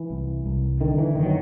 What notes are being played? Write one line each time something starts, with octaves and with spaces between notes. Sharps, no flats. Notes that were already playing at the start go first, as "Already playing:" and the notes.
Already playing: E3
C2
C2
D3 D#3
E3
F#1 D#3
F#3